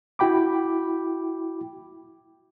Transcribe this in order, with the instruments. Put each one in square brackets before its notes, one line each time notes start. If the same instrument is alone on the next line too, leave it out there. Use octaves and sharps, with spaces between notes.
[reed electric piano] E4 F#4 G5 B5 D6